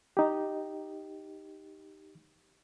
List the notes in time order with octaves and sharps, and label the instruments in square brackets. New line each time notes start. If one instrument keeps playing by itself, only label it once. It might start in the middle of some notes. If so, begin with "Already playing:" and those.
[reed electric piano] D#4 G4